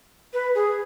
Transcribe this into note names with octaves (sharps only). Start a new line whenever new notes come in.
B4
G#4